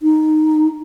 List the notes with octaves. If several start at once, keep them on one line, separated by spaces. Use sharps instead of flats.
D#4